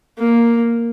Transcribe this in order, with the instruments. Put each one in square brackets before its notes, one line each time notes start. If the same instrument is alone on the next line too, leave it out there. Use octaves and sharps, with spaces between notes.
[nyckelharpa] A#3